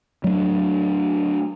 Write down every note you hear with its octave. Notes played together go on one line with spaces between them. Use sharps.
F#3 A3 C4 D4